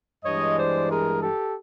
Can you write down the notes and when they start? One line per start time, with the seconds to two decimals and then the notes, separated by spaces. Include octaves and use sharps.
0.24 G2 E3 G#3 C#5 D#5
0.56 C5 D5
0.89 G#4 A#4
1.21 G4 A4